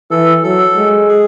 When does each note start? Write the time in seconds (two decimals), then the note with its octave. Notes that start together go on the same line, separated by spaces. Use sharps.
0.11 E3 A4
0.43 F#3 A4
0.77 G#3
1.09 G#4